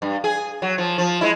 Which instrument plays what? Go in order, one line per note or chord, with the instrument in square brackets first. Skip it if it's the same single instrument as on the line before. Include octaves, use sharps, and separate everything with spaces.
[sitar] G2
G#4
F#3
F3
F3
G#3 E4